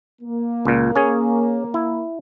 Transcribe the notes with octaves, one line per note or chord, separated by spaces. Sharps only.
A#3
C#2 A#2
C#4 G#4 C#5
E4